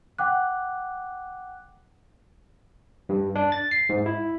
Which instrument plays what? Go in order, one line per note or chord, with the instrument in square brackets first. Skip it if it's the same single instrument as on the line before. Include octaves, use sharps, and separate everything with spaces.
[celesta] F#5 G5 D6 F#6
[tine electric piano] G2
D4
A6
C7
G#2
E4